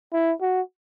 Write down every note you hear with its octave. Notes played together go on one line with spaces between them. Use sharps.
E4
F#4